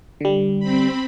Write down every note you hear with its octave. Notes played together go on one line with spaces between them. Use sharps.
D3 G3
C4 B5